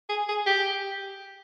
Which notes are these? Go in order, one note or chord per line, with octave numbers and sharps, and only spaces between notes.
G#4
G#4
G4